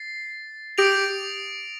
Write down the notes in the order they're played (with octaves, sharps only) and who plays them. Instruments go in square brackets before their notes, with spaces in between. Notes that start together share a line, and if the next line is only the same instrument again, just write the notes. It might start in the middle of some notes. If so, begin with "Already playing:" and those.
Already playing: [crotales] A6 C7
[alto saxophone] G4 [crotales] D#6 A#6 D7 F7